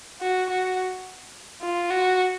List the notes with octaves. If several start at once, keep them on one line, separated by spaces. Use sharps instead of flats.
F#4
F#4
F4
F#4